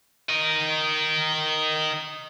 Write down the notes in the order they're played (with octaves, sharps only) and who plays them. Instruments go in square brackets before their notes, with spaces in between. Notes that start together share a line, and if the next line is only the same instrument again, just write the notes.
[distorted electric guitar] A#4 D#5